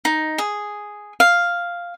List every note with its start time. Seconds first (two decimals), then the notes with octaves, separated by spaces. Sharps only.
0.05 D#4
0.38 G#4
1.20 F5